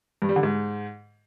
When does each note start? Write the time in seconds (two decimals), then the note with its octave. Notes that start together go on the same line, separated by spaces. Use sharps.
0.22 G2
0.29 G3
0.36 D3
0.43 G#2